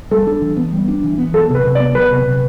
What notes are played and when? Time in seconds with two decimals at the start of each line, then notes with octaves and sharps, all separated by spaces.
0.11 G3 A4
0.27 D4
0.42 E3
0.57 B3
0.72 G3
0.88 D4
1.04 E3
1.18 B3
1.33 F#3 A4
1.49 C3
1.55 B4
1.65 C3
1.75 D5
1.80 B3
1.95 F#3 B4
2.11 C3
2.26 C3